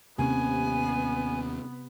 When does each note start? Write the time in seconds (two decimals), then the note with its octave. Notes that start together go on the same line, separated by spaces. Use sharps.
0.18 D#2 C3 A#3 B3 C#4 G#5